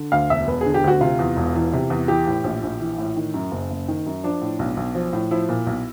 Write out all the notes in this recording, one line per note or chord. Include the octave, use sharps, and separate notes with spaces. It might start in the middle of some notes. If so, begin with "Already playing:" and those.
Already playing: D3
D2 F5
E1 E5
E1 B4
G#4
D3
G4
D2 F#4
C3 F4
E2
E1
E3
C3
E2
E3 G4
A2
A#1
A#1
E3
A2
D#3
F#2
F#1
F#1
D#3
F#2
F3 D4
A2
B1
B1
F3
A2
F3 E4
A#2
B1